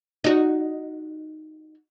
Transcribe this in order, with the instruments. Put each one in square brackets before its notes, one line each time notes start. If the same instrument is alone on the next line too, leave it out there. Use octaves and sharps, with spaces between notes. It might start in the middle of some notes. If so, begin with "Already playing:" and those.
[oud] D#4 F#4